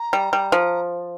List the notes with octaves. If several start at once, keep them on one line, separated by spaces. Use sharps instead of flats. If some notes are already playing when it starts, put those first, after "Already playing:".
Already playing: A#5
G3
G3
F3